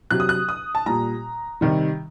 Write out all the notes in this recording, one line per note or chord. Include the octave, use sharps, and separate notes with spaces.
C3 F#3 F#6
D#6
F#6
D#6
A5
A#2 G3 A#5
C3 D#3 G3